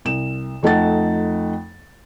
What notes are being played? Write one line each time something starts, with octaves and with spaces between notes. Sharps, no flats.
C2 E7
F2 A3 D#4 F#5 A6